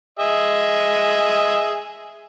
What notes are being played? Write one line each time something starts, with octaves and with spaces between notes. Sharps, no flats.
G#4 D#5 E5